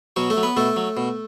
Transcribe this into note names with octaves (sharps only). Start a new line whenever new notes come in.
B2 F#3 F#4
A3 A4
F#3
B3 B4
B2 A3 A4
F#3
B2